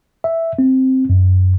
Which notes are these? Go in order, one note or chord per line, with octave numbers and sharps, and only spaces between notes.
E5
C4
F#2